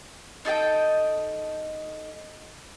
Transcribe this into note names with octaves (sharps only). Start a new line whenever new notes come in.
D#4 A4 D#5 G5